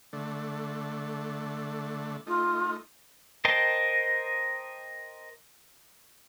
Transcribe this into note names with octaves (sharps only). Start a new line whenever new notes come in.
D3 A3
A3 D#4 F4
A#4 C5 D#5 G5 A5